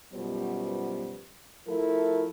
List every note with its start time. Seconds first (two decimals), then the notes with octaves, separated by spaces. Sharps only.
0.13 F#2 B2 F3 G3 B3 C5
1.67 F3 A3 E4 A4 A#4